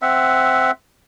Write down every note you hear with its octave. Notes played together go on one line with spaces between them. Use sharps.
C4 E5 F#5